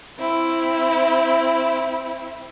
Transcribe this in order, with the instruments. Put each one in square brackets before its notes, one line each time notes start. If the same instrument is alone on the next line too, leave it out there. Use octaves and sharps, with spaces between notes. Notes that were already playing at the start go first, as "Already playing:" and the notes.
[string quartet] C4 E4